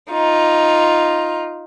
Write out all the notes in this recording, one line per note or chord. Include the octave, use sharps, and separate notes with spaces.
D#4 F4